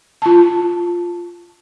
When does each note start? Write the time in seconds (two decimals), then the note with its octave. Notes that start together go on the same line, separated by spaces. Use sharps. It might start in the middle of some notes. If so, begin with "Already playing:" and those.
0.22 F4 A5